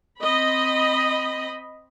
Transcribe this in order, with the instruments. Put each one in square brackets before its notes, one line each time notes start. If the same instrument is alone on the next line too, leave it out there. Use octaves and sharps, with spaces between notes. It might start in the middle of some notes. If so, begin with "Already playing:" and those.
[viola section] C4 D#5 B5